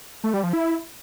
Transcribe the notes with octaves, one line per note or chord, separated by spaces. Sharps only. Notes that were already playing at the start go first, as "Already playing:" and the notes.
A3
G3
F3
E4